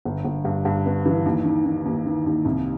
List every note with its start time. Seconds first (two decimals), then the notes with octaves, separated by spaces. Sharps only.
0.05 G1
0.25 G1
0.45 G2
0.65 G2
0.86 B3
1.06 E3
1.26 D#2
1.45 D#3
1.65 D#3
1.85 D#2
2.06 D#3
2.26 D#2
2.45 C2